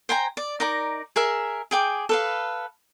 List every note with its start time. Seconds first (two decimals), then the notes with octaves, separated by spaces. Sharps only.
0.09 C5 G5 G#5 A#5
0.37 D5
0.60 D#4 A#4 D5 A#5
1.16 G#4 A#4 E5
1.71 G#4 G5 D6
2.09 A4 B4 F5